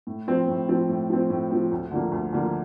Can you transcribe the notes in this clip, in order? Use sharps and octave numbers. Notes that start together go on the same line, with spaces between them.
A2
F3 C4
A2
F3 C4
A2
F3 C4
A2
F3 C4
D2
D3 F3 A#3
D2
D3 F3 A#3